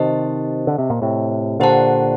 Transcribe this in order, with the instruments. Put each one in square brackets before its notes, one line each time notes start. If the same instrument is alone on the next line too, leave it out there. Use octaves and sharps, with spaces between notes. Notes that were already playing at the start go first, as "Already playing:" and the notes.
Already playing: [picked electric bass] C3 D#3 [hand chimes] G4 C5 D#5 A5
[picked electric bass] D3
C3
A#2
A2 C3
[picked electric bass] A#2 D3 [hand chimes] G4 C5 F#5 A5